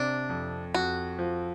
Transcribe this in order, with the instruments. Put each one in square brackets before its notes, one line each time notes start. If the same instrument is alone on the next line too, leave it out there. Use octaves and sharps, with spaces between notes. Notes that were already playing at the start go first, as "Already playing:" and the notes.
Already playing: [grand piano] C3 [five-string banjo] D4
[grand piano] F2
[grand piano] F2 [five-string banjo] F#4
[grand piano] F3